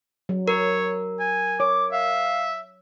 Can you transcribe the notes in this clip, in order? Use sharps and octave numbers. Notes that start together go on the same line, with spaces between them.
F#3
A#4 C#5
G#5
C#5 D6
E5 F5